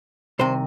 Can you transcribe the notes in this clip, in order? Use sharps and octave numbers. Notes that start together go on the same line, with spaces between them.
C2 C3 D#3 C5